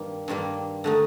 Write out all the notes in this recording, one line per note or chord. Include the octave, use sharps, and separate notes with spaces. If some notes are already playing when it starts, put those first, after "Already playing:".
Already playing: G2 D#3 G3 A#3 C4
G2 D#3 G3 A#3
D3 A3 D#4